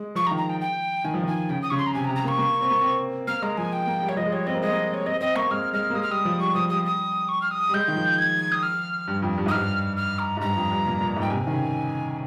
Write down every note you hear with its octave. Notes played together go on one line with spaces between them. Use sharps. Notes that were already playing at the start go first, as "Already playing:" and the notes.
Already playing: G#3
F3 C#6
A#5
D#3
A#5
G5
G5
D#3 G#5
F3
D#3 G#5
C#3 G5
D#6
C#3 C#6
C6
A#5
C3 G#5
A#5
C3
A#5
A#3 C#6
A#3
C4
A#3
C4
A#3 F6
G#3 A#5
F3 G#5
G5
A#3
G3
C#5
F3 D#5
G#3
G3 C#5
C4 D#5
A#3
G#3 D#5
A#3
C#5
C4 D#5
C4 D#5
A#3 C#6
A#3
G#3 F6
G#3 F6
A#3
G#3 D#6
F6
G3 D#6
F3
G3 C#6
F3 D#6
G3 D#6
D#6
C#6
F6
D#6
G3
G#3 G6
D#3
F3
G#6
D#6
F6
G2
F2
G2
G#2 D#6
G2 F6
F6
A#5
G#2
G2 A#5
F2
G2
A#2
A#2
G#2
G5
C3 G#5
D#3
C#3